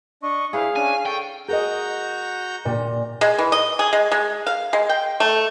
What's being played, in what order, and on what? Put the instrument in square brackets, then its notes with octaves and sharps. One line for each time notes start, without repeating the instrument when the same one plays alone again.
[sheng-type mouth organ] D4 D#5 [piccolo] C#6
[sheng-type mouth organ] E4 [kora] G#4 B4 C5 [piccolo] F5
[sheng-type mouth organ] C#4 D4 [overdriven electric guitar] G#5
[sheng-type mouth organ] A4 [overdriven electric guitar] G5 [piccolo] C#6
[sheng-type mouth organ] F#4 A#5 G6 [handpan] G#4 A#4 D#5
[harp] A#2
[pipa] G#3
E3
D#5
G#4
G#3
G#3
F5
G#3
G5
A3